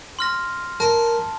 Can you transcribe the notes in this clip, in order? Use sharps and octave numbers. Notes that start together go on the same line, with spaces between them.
C6 F6 A#6
A#4 A5